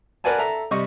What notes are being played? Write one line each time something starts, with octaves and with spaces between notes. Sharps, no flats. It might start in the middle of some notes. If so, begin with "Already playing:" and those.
A#4 B4 D5 F#5 G#5 A5
A4 E5 A#5
C3 G3 D#5 C#6